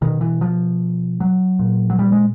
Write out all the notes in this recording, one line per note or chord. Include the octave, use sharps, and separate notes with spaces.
B2 D#3
E3
F3
F#3
A#2
F#3
G3
G#3